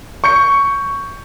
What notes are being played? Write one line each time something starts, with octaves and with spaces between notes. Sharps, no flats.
C#6 G6 C#7